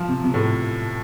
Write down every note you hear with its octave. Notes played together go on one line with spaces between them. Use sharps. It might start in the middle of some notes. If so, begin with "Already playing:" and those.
Already playing: F3
C3
C3
A2